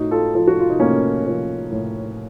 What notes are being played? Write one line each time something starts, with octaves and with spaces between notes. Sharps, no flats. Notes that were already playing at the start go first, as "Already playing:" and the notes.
Already playing: A2 D#4 F#4
F4 A4
F3 F4 A4
F#4
F4
D#4
A2 A#3 C#4
F3
A2